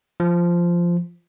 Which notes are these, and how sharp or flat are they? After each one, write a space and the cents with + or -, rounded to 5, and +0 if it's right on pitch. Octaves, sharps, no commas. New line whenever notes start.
F3 -10